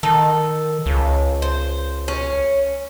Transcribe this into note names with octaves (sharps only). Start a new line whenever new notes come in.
D#3 A4
C#2
C5
C#4